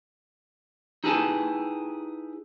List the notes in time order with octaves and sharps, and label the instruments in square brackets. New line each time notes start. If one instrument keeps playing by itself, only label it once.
[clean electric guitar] D#4 E4 G4 G#4 B4 A5